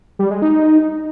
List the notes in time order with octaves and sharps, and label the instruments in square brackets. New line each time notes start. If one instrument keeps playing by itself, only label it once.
[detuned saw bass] G3
G#3
D#4